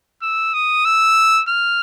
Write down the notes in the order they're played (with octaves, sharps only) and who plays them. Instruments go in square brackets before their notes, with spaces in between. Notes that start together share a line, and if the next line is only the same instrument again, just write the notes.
[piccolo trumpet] E6
D#6
E6
F6